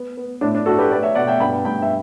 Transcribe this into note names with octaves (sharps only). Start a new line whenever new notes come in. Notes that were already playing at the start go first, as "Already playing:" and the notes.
Already playing: B3
B3
A2 D4
D4
A3 F#4 A4
G4 B4
A3 B4 D5
C#5 E5
B2 D5 F#5
E5 G5
G2 G5 B5
G2 G5 B5
E5